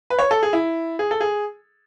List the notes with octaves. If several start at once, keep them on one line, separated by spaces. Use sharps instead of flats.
B4
C#5
A4
G#4
E4
G#4
A4
G#4